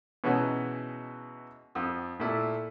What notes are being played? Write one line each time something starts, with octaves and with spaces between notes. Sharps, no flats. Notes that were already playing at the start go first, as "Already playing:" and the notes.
B2 E3 G#3 C#4 D#4 F#4
F2 D#6 E6
A#2 A3 E4